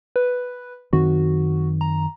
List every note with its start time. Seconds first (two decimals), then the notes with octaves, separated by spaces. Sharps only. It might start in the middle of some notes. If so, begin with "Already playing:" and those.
0.16 B4
0.93 F#2 D#3 C4 F#4
1.81 A#5